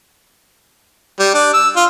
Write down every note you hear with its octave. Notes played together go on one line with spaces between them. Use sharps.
G3
D4
E6
F4